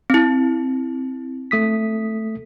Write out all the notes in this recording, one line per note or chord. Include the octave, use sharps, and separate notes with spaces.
C4 E4
A3 D#6 B6